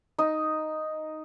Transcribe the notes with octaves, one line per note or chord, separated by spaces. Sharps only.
D#4